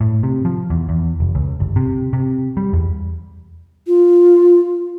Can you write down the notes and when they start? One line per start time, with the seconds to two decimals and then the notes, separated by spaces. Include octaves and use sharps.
0.01 A2
0.23 C3
0.45 F3
0.70 E2
0.89 E2
1.20 F1
1.35 C#2
1.60 G1
1.76 C3
2.13 C3
2.57 G3
2.73 E2
3.87 F4